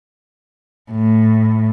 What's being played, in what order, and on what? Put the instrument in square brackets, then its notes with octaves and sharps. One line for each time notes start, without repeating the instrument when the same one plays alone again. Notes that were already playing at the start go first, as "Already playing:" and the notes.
[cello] A2